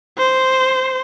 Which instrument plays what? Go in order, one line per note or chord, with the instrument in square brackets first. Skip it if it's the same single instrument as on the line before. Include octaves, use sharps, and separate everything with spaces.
[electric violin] C5